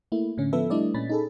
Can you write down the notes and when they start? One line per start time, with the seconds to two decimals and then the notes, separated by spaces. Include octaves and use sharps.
0.12 A3 A#3 E4
0.38 A2 D3 C#4
0.53 F3 B3 A4 B4 E5
0.70 G3 A3 D4 E4 D5 D#5
0.94 A#2 C#4 B5 A6
1.09 D#4 G#4 A4